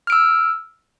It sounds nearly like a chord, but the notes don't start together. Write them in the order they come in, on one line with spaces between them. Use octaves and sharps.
F6 D7 E6